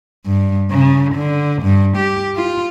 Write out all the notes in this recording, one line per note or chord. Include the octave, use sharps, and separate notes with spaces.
G2
C#3
D3
G2
G4
F4